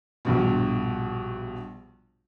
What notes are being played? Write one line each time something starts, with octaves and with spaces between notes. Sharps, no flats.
A#1 G2 B2